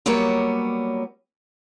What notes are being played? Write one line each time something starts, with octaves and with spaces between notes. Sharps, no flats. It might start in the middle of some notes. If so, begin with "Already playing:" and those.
F#3 G3 A#3 B3 C#5